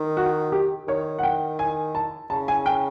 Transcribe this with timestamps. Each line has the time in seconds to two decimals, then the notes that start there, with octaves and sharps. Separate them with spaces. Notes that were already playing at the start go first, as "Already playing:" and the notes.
Already playing: D#3
0.17 F#4
0.52 G4
0.88 D#3 C#5
1.19 F#5
1.23 G5
1.59 G#5
1.95 A5
2.30 C#3 A5
2.48 G#5
2.66 G5